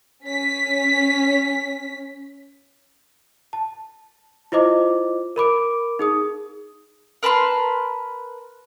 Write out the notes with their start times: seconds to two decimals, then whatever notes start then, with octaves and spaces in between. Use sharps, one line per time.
0.24 C#4 B6
3.53 A5
4.52 E4 F4 C5 D#5 D6
5.36 A#4 B5 D6 D7
5.99 D#4 G#4 D#6
7.23 A#4 B4 A5 C6